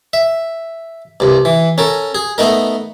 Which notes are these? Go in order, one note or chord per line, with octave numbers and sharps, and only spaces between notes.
E5
C2 G2
E3
C#4 A4 A#4
G#4
A3 B3 D#4 A#4